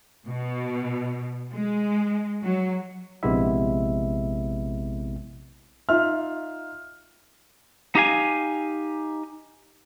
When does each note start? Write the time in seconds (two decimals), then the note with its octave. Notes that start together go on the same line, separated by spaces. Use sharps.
0.27 B2
1.52 G#3
2.43 F#3
3.23 A#1 C3 G#3 B3 E4 E5
5.89 D#4 F4 E5 F6
7.95 D#4 G4 F5 G#5